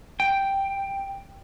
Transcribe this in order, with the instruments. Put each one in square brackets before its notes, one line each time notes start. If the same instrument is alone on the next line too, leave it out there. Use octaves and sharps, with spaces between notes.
[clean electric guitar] G5